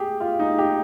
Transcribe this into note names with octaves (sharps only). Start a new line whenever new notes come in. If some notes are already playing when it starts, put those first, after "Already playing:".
Already playing: G4 G#4
F4
D#4
G4